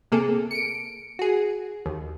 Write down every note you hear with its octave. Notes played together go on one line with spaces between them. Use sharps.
C3 A#3 G#4 A4
C#7 D7
F#4 G#4
D#2